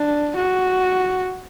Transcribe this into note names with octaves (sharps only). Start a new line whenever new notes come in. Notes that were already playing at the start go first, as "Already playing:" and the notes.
Already playing: D4
F#4